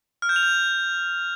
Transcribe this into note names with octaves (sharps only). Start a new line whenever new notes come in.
F6
G6
F7
G6